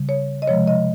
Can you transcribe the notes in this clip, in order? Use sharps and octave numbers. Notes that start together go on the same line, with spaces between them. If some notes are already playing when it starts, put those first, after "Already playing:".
Already playing: C#3 G3
C#5
D#5
C3 F3 G#3 C#5
D#5